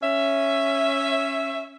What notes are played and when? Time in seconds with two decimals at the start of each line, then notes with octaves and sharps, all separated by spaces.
0.02 C#4 E5